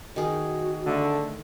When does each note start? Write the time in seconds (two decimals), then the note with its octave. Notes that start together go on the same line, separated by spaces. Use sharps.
0.16 D#3 F#4 G#4
0.87 D3 A3